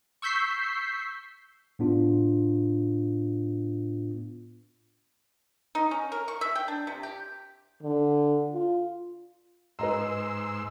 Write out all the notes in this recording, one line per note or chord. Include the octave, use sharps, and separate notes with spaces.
C#6 E6 G6 B6 C7
A2 B3 D4 F4
D#4
C#4
A#4
C#6
E5
G5
D4
C3
G4
D3
F4
G#2 B4 D#5 A#5 C6 E6